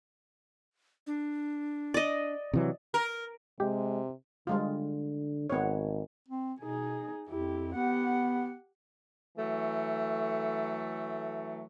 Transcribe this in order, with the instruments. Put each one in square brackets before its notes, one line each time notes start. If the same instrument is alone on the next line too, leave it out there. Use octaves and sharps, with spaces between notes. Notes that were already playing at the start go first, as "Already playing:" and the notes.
[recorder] D4
[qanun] D5 D#5
[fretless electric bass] C3 E3 F#3
[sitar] A#4
[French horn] C3 [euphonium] G#3 [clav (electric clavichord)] G4
[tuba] D3 [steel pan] G3 G#3 F4
[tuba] G#1 [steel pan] B3 C#5
[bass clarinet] C4
[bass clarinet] B2 [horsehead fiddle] D#4 G#4
[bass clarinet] F2 [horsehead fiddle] E4 G4
[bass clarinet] B3 [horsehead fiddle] G4 F#5
[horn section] E3 F#3 A3